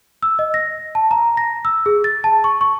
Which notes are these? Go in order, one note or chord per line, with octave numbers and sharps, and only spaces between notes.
E6
D#5
A#6
A5
A#5
A#6
E6
G#4
A6
A5
C#6
C#6